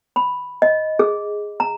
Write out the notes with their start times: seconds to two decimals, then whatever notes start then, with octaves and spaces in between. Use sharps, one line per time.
0.16 B5
0.62 D#5
0.99 G#4
1.60 A#5